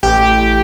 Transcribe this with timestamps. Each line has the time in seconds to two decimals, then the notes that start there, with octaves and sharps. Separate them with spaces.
0.03 A1 G4